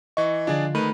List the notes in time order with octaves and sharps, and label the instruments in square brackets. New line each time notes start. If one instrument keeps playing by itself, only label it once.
[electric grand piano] E3 C#6 [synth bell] D#5
[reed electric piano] D3 F3 F4 [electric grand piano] D4 G#4 D5
[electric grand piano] D#3 B4 [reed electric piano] A3 [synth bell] B5 D#7